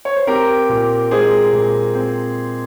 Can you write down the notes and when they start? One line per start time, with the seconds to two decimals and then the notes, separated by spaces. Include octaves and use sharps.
0.05 C#5
0.16 C5
0.27 C4 G4 A#4
0.69 A#2
1.11 G#3 G#4 C5
1.53 A#2
1.95 C4